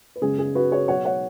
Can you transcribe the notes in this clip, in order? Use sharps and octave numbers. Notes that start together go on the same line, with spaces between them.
B4
F#2 C#3 G#3 B3 G#4
G#4
F#4 B4
G#4 C#5
B2 F#3 B3 C#5 F#5
C#5 F#5